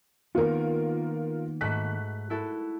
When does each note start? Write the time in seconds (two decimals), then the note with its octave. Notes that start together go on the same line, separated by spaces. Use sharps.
0.35 D#3 A#3 B3 F4 A#4
1.61 G#2 A3 F#4 F#6 B6
2.30 E4 F#4 A4